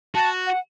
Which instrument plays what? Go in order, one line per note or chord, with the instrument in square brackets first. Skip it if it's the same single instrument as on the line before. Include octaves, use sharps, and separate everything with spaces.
[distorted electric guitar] F#4 [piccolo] A5
[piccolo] F#5